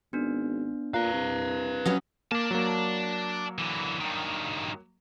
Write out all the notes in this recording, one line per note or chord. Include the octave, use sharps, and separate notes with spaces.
G#1 B3 D4
A#2 B4 F5 A#5 F#6
C2
F#3 B3 C#4 D#6
A#3 A#4 D5 A5
F#3 A#3
D3 E3
G2 D#3